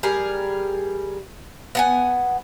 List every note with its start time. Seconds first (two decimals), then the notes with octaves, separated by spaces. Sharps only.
0.03 G3 G#4 A#4
1.75 B3 F#5 G#5